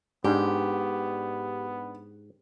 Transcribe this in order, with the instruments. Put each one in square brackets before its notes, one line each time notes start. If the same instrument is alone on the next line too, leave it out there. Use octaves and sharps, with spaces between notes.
[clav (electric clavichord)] G#2 [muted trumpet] B3 [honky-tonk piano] D4 [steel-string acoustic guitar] G4